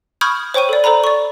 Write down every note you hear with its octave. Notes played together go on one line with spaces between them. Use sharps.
B5 C#6 D#6 F6 G6 G#6
C5 C#5 G5 C#6 D#7
A4 D5
A4 C5 D5 A#5 B5
D5 C#6